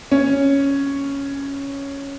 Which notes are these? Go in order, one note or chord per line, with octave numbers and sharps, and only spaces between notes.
C#4